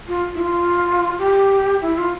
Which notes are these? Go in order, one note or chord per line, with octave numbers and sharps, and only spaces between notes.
F4
E4
F4
G4
E4
F4